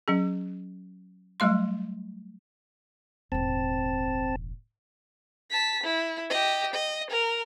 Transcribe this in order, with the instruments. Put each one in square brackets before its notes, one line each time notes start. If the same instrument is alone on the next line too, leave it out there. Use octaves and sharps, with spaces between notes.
[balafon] F#3 C#4 G#4
F#3 G3 A3 F5 C6
[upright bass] E1 A1 [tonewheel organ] C4 A5
[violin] A5 B6
E4
G4 D#5
D#5
A#4